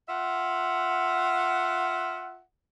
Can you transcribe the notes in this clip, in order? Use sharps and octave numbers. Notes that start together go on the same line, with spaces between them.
F4 E5 F#5